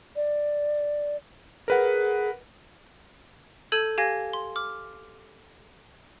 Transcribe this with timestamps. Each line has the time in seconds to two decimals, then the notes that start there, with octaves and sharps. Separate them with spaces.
0.16 D5
1.68 G#4 A#4 B4 F#5
3.72 A4 A5 E6 G6 G#6 D#7
3.98 G4 F5 G#5 G#6 A#6
4.33 C6
4.56 D6 F6